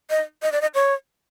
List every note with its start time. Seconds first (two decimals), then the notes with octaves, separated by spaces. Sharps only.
0.10 D#5
0.42 D#5
0.52 D5
0.61 D#5
0.75 C#5